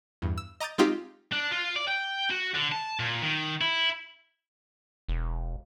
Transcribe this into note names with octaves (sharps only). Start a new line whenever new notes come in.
E2 G2
E6
D#5 A#5 D6 D#6 G6 A6
G#3 C4 D#4 F4 G4
D4
F4
D5
G5
F#4
D3
A5
A#2
D#3
E4
E1